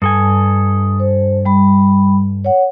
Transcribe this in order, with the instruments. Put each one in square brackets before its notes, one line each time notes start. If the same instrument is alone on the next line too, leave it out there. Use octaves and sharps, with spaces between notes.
[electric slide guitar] G2 A4 G#5 [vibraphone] D#6
[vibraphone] C5
G3 B5
C#5 F#5